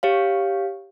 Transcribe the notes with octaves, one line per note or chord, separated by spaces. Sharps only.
G4 C#5 F5